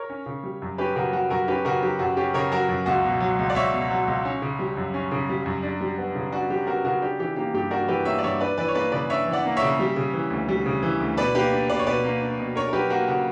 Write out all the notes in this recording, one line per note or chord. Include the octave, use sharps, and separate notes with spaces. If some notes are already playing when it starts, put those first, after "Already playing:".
Already playing: A#4 C#5
C#4
C#3
G3
F#2
C#4 G4 B4
C#3 F#4 A#4
G3 F#4
F#2 F#4 A#4
C#4 G4 B4
C#3 F#4 A#4
F#3 G4
F#2 F#4
C#4 G4
C#3 A#4 C#5
F#3 F#4 A#4
F#2
C#2 F#4
B2
F#3
C#2
D5
C#2 C#5 E5
B2
F#3
C#2
C#4
C#3
G3
F#2
C#4
C#3
G3
F#2
D4
G3
B3
C#3
D4 F#4
G3 G4
B3 F#4 A#4
C#3 F#4 A#4
D4 G4
E3 G4
A#3 G4
G2 G4
D4 F#4 A#4
E3 G4 B4
A#3 C#5 E5
D5
G2 C#5 E5
D4 B4 D5
E3 B4 D5
C#5
A#3 B4 D5
C#3 B4 D5
D4 C#5 E5
E3
D5 F#5
A#3
C#5 E5
C#3
G3
C#3
E3
D2
G3
C#3
E3
D2
B2 B4 D5
A#3 G4 B4
D4
B2 B4 D5
C#5
B2 B4 D5
A#3
D4
B2
D4 A#4 C#5
A#4
F#3 G4 B4
A#3 F#4 A#4
C#3 F#4